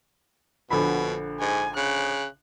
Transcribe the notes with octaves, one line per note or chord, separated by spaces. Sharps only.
A#1 B2 D3 B5
G#2 G#5
C#3 F#6